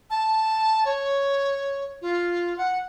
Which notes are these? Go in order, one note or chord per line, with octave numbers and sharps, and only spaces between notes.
A5
C#5
F4
F#5